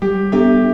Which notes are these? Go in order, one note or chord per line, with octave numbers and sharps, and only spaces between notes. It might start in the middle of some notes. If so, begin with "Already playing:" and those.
G3 G4
B3 D4 G4 A4 E5